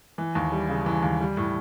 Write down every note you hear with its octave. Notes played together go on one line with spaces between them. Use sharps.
E3
D#2
G3
C#3
E3
D#2
G3
A2